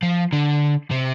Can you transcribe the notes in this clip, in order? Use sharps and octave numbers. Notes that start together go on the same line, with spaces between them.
F3
D3
C3